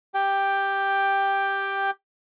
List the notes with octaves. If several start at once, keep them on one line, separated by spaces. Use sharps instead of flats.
G4 G5